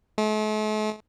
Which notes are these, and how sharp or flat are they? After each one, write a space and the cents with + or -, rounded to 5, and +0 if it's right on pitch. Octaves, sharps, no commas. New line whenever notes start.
A3 -45